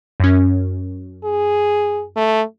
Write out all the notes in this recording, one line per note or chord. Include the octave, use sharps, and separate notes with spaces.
F#2 C#4
G#4
A3